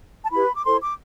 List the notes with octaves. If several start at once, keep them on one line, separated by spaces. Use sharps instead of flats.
A5
E4 G4 B4 B5
D6
E4 A4 C5 C6
D6